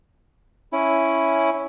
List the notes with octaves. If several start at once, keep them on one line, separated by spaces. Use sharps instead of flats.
C#4 E4